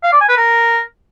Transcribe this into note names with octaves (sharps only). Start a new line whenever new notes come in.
F5
D5
G#5
B4
A#4